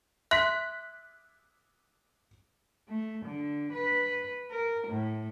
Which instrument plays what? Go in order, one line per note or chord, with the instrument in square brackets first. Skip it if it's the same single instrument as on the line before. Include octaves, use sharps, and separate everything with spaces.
[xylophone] E5 C6 [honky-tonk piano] F#6 B6
[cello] A3
D3
B4
A#4
A2